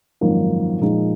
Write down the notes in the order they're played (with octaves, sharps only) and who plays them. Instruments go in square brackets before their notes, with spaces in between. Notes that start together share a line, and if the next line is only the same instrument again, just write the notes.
[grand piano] G#1 F#2 F3 A#3 D#4
A#2 F3 G#3 D#4